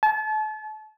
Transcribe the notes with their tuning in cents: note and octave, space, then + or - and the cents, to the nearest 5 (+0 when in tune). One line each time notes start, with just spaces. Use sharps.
A5 -35